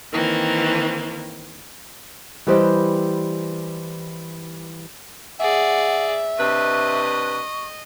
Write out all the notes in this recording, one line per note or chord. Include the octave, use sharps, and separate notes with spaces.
D#3 E3 A#3 C4
E3 G3 G4 B4 C5 D#5
G#4 D5 E5 F#5
C3 D4 B4 D#5 C#6